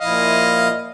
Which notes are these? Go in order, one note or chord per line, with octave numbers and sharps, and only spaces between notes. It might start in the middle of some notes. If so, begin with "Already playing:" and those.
A#2 F3 E4 D#5 F5